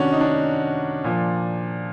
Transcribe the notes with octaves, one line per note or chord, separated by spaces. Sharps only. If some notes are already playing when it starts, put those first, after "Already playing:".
Already playing: C3 D#3 C#4 D4 F#4
D#4
D4
A#2 F3